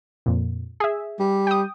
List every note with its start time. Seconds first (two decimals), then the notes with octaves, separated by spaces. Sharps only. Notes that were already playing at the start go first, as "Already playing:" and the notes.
0.26 F2 A#2
0.80 G#4 E5
1.19 G3
1.47 G5 D#6